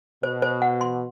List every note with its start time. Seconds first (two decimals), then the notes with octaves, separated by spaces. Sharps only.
0.23 B2 C5
0.42 C5
0.62 F#5
0.81 C6